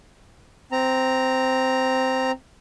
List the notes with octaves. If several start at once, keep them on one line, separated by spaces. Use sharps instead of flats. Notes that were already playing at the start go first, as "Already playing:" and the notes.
C4 A#5